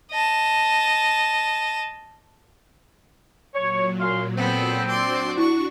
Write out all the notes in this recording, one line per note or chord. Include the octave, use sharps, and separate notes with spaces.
D#5 A5
A#2 F#3 C#5
F#2 F5 C6
B3 C4 A4
D4 F#4 D5 C6
E4 C#6